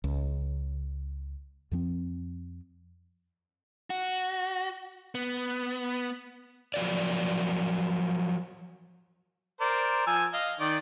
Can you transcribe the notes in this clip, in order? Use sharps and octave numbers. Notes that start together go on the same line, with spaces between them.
C#2
F2 F3 C4
F#4
B3
F3 F#3 A#4 D5
A#4 C5 D5
F3 G#5 E6
D#5 F5
D#3 D5